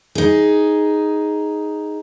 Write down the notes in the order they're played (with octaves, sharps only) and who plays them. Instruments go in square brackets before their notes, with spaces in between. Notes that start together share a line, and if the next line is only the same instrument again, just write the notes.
[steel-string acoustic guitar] D#4 G#4